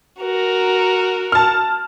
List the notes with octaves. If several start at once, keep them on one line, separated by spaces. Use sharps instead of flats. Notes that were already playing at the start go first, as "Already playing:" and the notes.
F#4 A#4
A5 F6